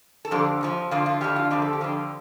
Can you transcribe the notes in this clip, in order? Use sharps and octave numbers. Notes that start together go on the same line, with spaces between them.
A4
F2 D3 F3 G4
F2 D3 F3
F2 D3 F3 F4
F4
F2 D3 F3 G4
F4
F2 D3 F3 G4
A4
G4
F2 D3 F3